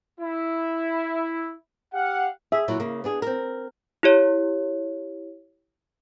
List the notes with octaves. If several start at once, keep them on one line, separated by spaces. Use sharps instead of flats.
E4
G4 F5 F#5
G#4 E5
A#2 F#3 E4
C#3 A#3
B3 D4 G#4
C4 A#4
E4 G4 C#5